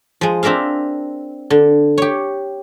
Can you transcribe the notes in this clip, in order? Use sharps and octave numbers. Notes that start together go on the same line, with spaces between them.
F3 G#3
C4 D4 A#4 E5 F5
D3
G4 C#5